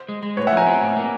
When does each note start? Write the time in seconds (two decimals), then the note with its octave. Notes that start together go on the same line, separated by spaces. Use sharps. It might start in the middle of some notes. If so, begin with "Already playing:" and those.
Already playing: C5
0.09 G#3
0.23 G#3
0.37 A2 B4 C#5
0.47 E5 F#5
0.52 F3 G#5 A#5
0.66 C4
0.82 A2
0.96 A#3